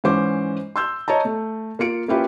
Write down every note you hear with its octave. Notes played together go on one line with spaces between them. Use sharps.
G#2 E3 C#4 C5 D6
C6 E6 G6
C#5 D#5 A5 A#5
A3
A#3 F4 C#7 D7
A#3 C#4 E4 F4 G4 B4